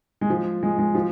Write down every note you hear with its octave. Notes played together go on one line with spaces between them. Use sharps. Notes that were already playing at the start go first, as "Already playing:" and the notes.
G#3
F3
G#3
G#3
F3